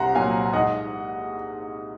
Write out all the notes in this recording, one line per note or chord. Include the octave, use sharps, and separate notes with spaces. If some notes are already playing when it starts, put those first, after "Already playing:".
Already playing: C2 F#5 A#5 C6
A#2 F#3 F5 G#5
G#2 D#5 F#5